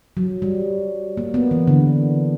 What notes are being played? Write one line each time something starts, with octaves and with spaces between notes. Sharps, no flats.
F#3
G3
A#3
B3
E3
D3